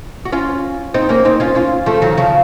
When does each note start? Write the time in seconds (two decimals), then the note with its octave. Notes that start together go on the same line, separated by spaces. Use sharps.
0.25 F#4
0.32 C#4 F4
0.94 C4 D#4
1.09 A#3 C#4
1.25 C4 D#4
1.40 C#4 F4
1.55 C#4 F4
1.86 F3 A3
2.02 D#3 F#3
2.18 C#3 F3